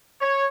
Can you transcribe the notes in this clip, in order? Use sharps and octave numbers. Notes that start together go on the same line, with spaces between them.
C#5